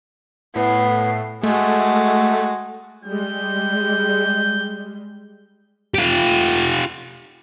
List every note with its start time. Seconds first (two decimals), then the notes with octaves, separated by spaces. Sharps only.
0.55 A2 B3 C7
1.43 G#3 A3 F#4
3.05 G3 G#3 G6
5.94 F4 G4